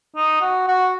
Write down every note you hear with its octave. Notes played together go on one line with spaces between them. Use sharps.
D#4
F#4
F#4